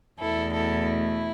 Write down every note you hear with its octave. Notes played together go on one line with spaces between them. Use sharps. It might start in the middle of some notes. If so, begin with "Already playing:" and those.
E2 B2 A3 E4 A4
E4 A4
E4